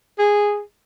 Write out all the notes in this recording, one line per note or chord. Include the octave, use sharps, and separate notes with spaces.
G#4